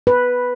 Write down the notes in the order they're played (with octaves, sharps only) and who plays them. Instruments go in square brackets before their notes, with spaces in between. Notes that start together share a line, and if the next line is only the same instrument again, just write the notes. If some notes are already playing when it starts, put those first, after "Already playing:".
[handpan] B4